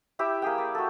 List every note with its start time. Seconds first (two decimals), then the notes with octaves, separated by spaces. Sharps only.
0.19 E4 G4 E5 G5
0.42 A#3 G4 G#4 G5
0.58 D5
0.75 F#4 A4